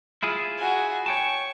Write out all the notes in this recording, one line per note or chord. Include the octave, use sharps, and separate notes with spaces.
E4 F4 G#4
F#4 G#5
C#5 G5 A5 C#6